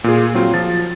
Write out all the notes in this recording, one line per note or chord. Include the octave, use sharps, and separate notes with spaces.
A#2 F4 G#4
F#3 C4 F4
F3 A6